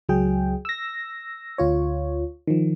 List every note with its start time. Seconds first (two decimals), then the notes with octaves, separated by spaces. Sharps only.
0.09 C#2 F#3 G#4 G5
0.65 E6 A#6
1.58 D2 F4 C#5
2.47 D#3 F3